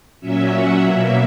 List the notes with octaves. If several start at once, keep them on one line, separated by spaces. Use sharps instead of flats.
A#2 F#3 C#4 E5
F#5
B2 F#3 A#3 E5